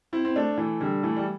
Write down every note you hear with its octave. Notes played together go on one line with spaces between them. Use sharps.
C4 E4
C4
A3 D4
E3 A3
D3 G3
E3 A3
G3